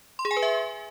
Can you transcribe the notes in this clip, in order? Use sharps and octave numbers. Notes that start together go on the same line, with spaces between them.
C6
G#4
G#5
B4
E5